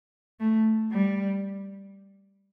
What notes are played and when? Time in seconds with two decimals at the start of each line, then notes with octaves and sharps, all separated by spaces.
0.40 A3
0.92 G3